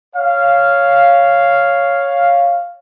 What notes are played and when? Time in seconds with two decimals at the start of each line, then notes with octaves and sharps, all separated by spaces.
0.16 C#5 F5